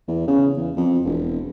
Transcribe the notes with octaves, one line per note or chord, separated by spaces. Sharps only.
E2
C#3
E2
F2
E1